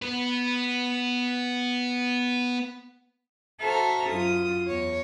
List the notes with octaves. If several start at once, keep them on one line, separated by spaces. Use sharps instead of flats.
B3 B4
F#4 A4 C5 E5 A#5 F6
F#2 F4 D#6
E2 C#5